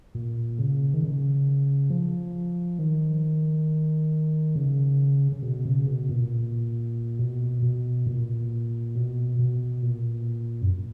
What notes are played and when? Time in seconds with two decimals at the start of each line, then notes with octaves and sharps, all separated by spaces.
0.15 A#2
0.59 C#3
0.94 D#3
1.03 C#3
1.90 F3
2.79 D#3
4.55 C#3
5.32 C#3
5.42 B2
5.65 C#3
5.86 B2
6.09 A#2
7.19 B2
7.62 B2
8.07 A#2
8.95 B2
9.39 B2
9.83 A#2
10.61 F#2